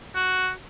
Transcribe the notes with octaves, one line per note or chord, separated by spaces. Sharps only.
F#4